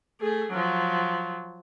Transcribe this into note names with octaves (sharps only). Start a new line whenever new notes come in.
A3 G#4
F3 F#3